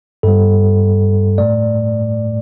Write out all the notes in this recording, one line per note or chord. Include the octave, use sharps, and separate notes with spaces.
G2 G3 A4
A2 A3 D5